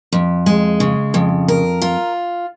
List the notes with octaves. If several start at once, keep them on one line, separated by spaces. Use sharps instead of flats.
F2
G#3
C#3
F2
A#4
F4